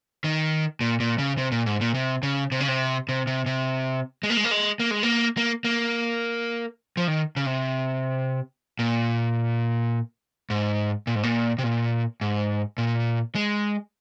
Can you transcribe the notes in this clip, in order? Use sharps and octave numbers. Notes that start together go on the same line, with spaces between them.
D#3
A#2
A#2
C#3
C3
A#2
G#2
A#2
C3
C#3
C3
C#3
C3
C3
C3
C3
G#3
A#3
G#3
A#3
G#3
A#3
G#3
A#3
A#3
A#3
F3
D#3
C#3
C3
A#2
G#2
A#2
G#2
A#2
C3
A#2
G#2
A#2
G#3